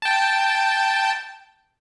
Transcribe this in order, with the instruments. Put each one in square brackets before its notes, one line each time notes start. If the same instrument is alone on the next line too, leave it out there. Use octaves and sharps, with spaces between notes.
[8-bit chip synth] G5 A5